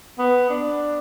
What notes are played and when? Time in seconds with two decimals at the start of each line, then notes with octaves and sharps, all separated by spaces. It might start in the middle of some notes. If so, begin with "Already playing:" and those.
0.18 B3
0.50 D4